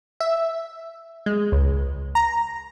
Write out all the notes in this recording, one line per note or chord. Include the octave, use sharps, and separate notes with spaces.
E5
G#3
C#2
A#5